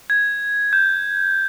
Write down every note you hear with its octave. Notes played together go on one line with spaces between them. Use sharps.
G#6
G6